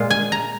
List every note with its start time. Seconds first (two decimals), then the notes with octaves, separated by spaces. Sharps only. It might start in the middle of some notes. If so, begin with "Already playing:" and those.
Already playing: A#2 G#3 F4
0.10 G#5
0.32 A#5